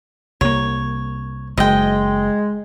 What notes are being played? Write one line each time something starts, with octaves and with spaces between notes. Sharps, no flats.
C2 A#3 C#5
F#1 G#3 D#5 G5